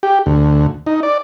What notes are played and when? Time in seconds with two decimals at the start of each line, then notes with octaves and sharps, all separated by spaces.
0.03 G4
0.26 D2
0.87 D#4
1.03 D5